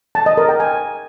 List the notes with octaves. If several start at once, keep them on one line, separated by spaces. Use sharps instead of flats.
A5
D#5
A#4
G5
G#5